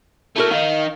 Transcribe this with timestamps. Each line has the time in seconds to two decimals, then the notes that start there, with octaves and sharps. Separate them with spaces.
0.36 A3 E4 F#4 A#4
0.51 D#3 D#4 F5